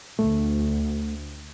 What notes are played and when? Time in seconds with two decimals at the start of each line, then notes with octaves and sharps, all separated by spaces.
0.19 D2 A3